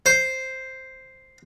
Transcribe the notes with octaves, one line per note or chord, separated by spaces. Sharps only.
C5